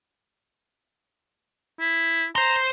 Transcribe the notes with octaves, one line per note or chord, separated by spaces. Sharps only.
E4
C5 A#5 C6